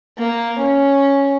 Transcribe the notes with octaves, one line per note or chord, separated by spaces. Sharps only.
A#3
C#4